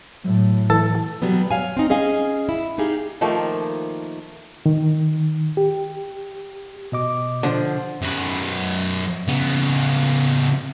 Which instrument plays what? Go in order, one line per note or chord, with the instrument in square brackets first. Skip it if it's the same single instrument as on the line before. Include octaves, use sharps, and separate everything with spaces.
[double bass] A2 [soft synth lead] F#3
[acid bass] E3 [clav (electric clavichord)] A4
[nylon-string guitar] B2 F#3 G3 B3
C#5 F5 G#5
C4 D#4
C#4 G#4 D#5 F5 G#5
E4
D#4 G4 G#4 F5
[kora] D#3 F3 A3 A#3
[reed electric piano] D#3
G4
[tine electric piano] B2 D#5 D6
[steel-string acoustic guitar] D3 F3
[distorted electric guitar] F#2 B4
C#3 B3